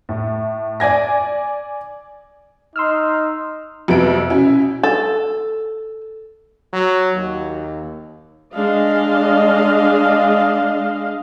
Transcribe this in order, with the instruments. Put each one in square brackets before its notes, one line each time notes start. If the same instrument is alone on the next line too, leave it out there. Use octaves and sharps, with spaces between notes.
[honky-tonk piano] A2
D5 G#5 G#6 A#6
[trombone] D#4 [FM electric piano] C6 E6 F6
[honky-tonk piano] F2 C3 F#3 B3 E5 D7
B2 C#4 E4
[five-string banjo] A4
[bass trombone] F#3
D#2
[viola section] G#3 D4 D#5 F5